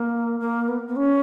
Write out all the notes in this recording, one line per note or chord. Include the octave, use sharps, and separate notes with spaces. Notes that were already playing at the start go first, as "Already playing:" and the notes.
Already playing: A#3
A#3
B3
B3
C#4